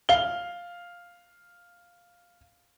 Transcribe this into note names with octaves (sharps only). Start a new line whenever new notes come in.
F5 G7